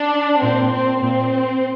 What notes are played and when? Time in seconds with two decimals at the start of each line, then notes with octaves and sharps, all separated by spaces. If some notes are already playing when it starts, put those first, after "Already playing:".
Already playing: D4
0.42 A#2 C4
0.71 C4
1.01 A#2 C4